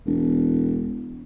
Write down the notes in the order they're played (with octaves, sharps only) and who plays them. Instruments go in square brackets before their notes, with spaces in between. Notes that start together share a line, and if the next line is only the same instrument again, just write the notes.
[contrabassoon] E1